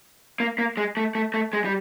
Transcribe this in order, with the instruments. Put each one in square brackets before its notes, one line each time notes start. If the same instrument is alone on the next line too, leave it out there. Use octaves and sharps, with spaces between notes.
[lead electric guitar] A#3
A#3
G#3
A3
A3
A3
G#3
G3